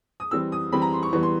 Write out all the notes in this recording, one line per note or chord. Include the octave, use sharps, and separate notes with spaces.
D#6
E3 G3 C4 E6
D#6
E3 G3 C4 B5
A#5
C6
C#6
E3 G3 B3 C#6
C6